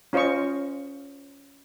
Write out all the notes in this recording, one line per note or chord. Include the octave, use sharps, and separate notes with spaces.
C#4 F4 C5 D#5 C#6